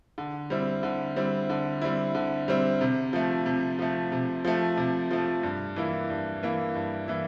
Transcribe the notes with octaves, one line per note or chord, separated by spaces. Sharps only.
D3
G3 C4 E4
D3
G3 C4 E4
D3
G3 C4 E4
D3
G3 C4 E4
C3
F3 A3
C3
F3 A3
C3
F3 A3
C3
F3 A3
G2
E3 A#3 E4
G2
E3 A#3 E4
G2
E3 A#3 E4